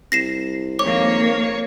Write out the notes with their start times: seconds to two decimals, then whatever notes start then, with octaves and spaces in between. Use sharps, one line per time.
0.12 C2 A#6 C7 E7
0.79 G#1 F2 A#3 C#5 D6